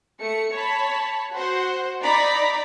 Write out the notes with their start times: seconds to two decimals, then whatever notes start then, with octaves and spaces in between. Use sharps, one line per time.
0.21 A3 C#7
0.53 C#5 A5 B5
1.34 F#4 C5 F#5
2.01 D#4 D5 A#5 B5